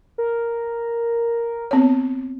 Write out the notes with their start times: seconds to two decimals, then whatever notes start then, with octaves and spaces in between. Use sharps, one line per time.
0.18 A#4
1.71 B3 C4 C#5